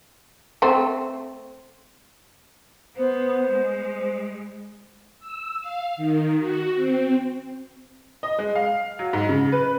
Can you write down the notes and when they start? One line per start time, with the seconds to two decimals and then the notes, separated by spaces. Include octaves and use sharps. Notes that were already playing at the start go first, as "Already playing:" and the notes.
0.62 A3 C4
2.97 B3 C5
3.50 G#3
5.19 E6
5.61 F5
5.97 D#3
6.39 F#4
6.74 C4
8.23 D#5
8.38 G#3
8.56 F5
8.99 F#3
9.13 G#2
9.29 C#3
9.52 B4